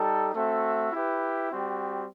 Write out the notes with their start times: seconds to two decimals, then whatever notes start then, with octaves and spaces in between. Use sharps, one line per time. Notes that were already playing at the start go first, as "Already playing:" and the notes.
Already playing: G3 D#4 A4
0.34 A3 C4 F#4 A4 E5
0.92 E4 G4 B4
1.50 G3 C4 F#4